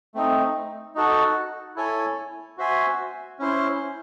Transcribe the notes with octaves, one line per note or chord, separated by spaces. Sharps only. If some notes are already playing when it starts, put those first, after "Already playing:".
A3 C4 D#4
D#4 F#4 A4
E4 A4 C#5 G#5
F#4 C5 E5 G#5
C#4 E4 C5